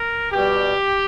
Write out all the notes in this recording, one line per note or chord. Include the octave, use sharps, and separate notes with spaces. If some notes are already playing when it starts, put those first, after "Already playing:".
Already playing: A#4
B2 G3 G4